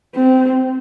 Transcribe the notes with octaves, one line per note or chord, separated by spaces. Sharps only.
C4